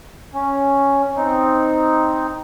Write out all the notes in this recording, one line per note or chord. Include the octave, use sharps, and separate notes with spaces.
C#4
C4 D#4